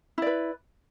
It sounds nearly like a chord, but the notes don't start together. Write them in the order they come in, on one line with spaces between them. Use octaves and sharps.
E4 D5 B4